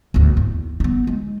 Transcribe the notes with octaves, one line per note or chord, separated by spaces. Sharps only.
G#1 D2
E2
B3 D#4
G#3